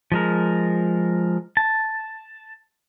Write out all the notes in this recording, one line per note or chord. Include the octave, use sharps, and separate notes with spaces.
F3 G#3 A#4
A5